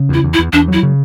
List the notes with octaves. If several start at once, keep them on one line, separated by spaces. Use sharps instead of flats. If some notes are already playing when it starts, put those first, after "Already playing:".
Already playing: C#3
E2 E4
E2
E4
E2
E2 D4
F#3 E4
C#3